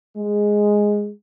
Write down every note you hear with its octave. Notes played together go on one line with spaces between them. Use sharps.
G#3